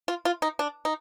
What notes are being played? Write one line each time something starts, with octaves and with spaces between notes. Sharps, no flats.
F4
F4
D#4
D4
D#4